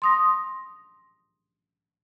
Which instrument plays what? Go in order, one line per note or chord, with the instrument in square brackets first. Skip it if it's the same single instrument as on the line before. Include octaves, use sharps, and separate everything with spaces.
[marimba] C6 D#6 A#6